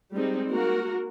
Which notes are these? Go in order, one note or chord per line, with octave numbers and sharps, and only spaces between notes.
G3 G#3 C4 D#4
A#3 F#4 A#4